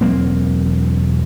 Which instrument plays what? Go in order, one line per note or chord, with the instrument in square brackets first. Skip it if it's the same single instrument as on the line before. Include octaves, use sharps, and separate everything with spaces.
[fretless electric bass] E1 F#3 A#3 C4